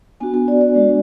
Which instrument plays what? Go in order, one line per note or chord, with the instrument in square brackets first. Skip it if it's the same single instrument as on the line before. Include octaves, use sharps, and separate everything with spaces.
[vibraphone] B3 D4 F#4 G#5
G#5
D5
D5
G#3 D4 F#4